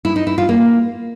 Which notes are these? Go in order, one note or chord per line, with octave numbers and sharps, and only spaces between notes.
E4
D#4
E4
F4
A#3